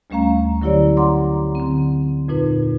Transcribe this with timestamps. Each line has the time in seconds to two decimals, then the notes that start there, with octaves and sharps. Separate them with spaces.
0.10 D2 G3 A3 C#4 F5 A#5
0.62 D3 F#3 E4 G4 C#5 D5
0.97 F#5 A#5 C6 D6
1.55 D3 C4
2.28 F2 A#2 D#4 B4